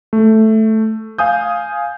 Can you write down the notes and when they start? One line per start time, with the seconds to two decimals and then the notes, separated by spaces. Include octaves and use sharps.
0.13 A3
1.18 F5 G#5 D#6 G6